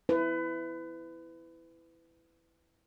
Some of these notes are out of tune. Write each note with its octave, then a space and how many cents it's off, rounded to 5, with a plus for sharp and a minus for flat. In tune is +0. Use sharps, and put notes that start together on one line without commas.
E4 +0 B4 +30